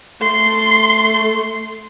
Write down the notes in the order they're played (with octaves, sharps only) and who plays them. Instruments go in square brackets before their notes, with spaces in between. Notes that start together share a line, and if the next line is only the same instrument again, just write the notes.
[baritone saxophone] A3 [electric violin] C6